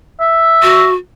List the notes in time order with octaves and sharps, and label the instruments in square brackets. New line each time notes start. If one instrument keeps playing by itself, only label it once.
[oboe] E5
[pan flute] F#4